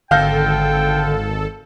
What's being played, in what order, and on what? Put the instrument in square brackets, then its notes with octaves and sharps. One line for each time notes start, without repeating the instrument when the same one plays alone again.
[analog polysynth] G#1 A4 [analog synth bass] D3 [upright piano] F5 G6 A#6 [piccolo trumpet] G5